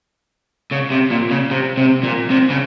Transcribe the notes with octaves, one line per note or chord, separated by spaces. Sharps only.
C#3
C3
A#2
C#3
C3
C3
A#2
C3
C#3